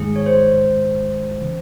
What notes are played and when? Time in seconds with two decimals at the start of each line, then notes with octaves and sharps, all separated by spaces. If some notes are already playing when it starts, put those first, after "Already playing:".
Already playing: G#2 D#3 G#3 G#4
0.16 C#5
0.26 C5
1.41 C#3 E3